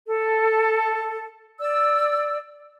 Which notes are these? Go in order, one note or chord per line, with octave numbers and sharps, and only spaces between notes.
A4
D5 E6